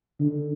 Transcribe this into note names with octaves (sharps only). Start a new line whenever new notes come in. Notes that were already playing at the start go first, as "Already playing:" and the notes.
D3